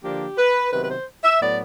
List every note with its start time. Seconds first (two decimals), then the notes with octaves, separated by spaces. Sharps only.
0.03 D3 F3 A#3 D4 G4
0.37 B4
0.72 C3 D#3 F#3 B3 B4
0.83 B4
0.89 C5
1.24 E5
1.41 A2 F#3 B3 D5